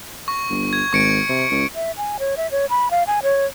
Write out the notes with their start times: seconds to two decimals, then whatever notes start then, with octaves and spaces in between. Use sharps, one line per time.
0.28 C#6
0.50 G1
0.73 G#6
0.93 G#1 C#6 C#7 D7
1.29 C3
1.50 C#2
1.75 E5
1.97 G#5
2.19 C#5
2.37 E5
2.51 C#5
2.70 B5
2.91 F5
3.07 G#5
3.23 C#5